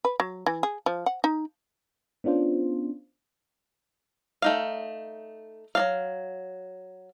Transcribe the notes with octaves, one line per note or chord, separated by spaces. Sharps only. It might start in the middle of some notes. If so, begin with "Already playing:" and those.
B4
F#3
E3
G#4
F3
F#5
D#4
B3 C#4 D4 F4 C5
A3 D#4 F5
F#3 C4 F5